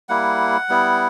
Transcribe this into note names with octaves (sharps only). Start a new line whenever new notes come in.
G3 A#3 E4 F#5
G3 B3 E4